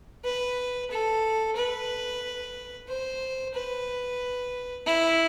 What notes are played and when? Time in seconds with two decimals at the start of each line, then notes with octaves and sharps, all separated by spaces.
0.24 B4
0.90 A4
1.56 B4
2.88 C5
3.55 B4
4.87 E4